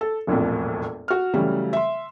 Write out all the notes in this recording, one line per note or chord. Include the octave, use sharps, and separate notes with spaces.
A4
E1 A#1 F2 A2
F#4 F6
C#3 E3 F#3 G3 A3
E5 C6